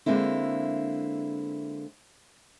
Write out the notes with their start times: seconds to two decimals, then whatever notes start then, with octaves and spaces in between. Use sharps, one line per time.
0.06 D3 G#3 A#3 C4 E4